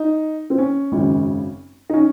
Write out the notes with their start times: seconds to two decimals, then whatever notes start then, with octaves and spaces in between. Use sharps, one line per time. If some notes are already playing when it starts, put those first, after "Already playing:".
Already playing: D#4
0.50 C4
0.58 C#4
0.92 G#1 F#2 C#3
1.90 D#4
1.93 C#4